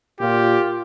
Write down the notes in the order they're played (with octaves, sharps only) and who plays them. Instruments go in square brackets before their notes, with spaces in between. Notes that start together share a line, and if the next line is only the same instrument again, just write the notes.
[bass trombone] A#2 [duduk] F4 [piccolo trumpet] G4